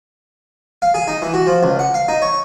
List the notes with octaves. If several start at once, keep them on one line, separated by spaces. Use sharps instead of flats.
F5
G#4
D#4
E3
F#4
F3
C#2
F#5
F5
D#4
C#5